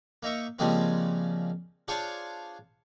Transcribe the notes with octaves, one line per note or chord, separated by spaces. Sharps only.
A#3 D#4 E5 C#6
C#3 F3 G3 G#3 A#3 C4
D4 F4 G#4 C5 C#5 F5